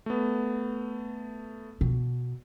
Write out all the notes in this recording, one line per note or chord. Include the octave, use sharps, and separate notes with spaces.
A3 B3
B2